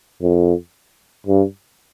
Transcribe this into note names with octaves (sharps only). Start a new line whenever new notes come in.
F2
G2